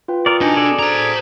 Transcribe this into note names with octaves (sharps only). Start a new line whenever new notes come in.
F4 B4 G5
A#4 D5 D#6 C#7
D4 D#4 F#4 G#5 A5 C6
G#4 A4 D5
C5 A#5